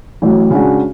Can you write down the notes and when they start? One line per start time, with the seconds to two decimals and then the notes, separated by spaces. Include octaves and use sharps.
0.22 A1 A2 F#3
0.50 C#3 G#3 D4 F#4